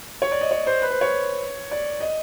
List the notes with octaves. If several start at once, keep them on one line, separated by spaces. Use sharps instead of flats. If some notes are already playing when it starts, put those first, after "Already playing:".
C#5
D5
D#5
C#5
C5
B4
C5
C#5
D5
D#5